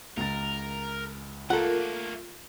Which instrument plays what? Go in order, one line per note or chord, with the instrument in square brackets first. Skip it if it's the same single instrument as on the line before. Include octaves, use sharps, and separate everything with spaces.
[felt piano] C#2 A6 [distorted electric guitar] A#4
[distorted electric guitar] A3 A#3 [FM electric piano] F4 A#4 [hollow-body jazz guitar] A4 F#5